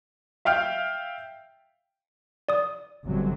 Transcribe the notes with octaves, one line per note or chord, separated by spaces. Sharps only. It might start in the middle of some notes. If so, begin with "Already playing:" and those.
E5 F5 G5 F6
D5 D#6
G1 C3 F#3